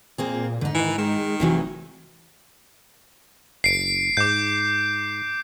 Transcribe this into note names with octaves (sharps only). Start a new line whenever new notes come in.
A#2 A#3 C4 G#4
G#2 D3 D#4
D#3 E3
D#3 G#3
F1 C3 E3 F#3
F#1 C7 D7
G#2 D6 G6